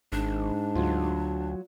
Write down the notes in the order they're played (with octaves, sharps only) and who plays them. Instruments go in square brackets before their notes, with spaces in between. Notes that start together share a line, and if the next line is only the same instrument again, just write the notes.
[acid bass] G#1 [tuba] G#2 [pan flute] D4
[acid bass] D2 [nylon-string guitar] F#3 F4